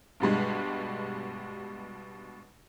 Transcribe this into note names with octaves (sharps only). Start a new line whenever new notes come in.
G2 B2 G3 G#3